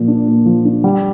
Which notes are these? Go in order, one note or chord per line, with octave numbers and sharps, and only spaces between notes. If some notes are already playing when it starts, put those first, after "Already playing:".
Already playing: A#2 F3
D4
A#2
F3
D4
G3